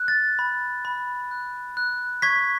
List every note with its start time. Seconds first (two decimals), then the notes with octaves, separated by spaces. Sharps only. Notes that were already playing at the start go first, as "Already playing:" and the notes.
Already playing: F#6
0.08 A6
0.39 B5
0.85 B5
1.31 F#6
1.77 F#6
2.22 C#6 G#6 B6